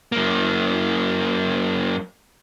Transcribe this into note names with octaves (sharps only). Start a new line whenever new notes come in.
F#2 A#3